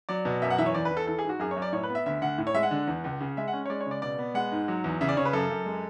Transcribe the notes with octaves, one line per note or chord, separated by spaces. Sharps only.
F#3 D5
B2
F#2 E5
F#5
E3 E5
C#5
E2 D5
B4
E2
A4
E3 A4
G#4
G#2
F#4
F#2 G#4
C#5
F#2
D5
A2 C#5
B4
B3
E5
D2 E5
D2 F#5
A2
C#5
G#3 E5
F#5
D3
E2
C#2
C#3
G#3 E5
F#5
C#4
C#5
G#3 D5
C#5
C#3
D5
B2 D5
B3
G#3 F#5
G#2
F#3
E2
C#3 E5
D5
C#3 C#5
B4
F#2 A4
F#2
G#3